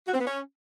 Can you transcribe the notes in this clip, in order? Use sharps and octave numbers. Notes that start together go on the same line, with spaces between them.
F#4
C4
B3
C#4